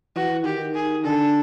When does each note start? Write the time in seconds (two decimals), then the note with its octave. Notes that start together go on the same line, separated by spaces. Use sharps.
0.15 E3 F#4
0.44 D#3 G4
0.74 G#4
1.04 D3 A4